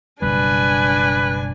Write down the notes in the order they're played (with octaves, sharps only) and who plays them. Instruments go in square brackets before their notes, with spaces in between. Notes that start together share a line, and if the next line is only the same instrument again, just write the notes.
[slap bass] F#1 B2 G3 [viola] D4 G#5 [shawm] B4